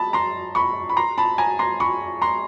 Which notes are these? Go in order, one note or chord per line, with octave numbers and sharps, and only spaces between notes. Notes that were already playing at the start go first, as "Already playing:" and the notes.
Already playing: A5 B5
A#5 C6
B5 C#6
B5
A#5 C6
A5 B5
G#5 A#5
A#5 C6
B5 C#6
A#5 C6